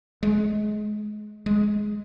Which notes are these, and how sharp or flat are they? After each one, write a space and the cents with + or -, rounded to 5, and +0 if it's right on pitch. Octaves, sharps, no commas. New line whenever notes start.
G#3 +25
G#3 +5